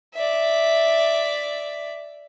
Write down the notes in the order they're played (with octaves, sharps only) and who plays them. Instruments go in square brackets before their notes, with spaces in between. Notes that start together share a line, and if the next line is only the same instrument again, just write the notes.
[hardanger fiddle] D5 E5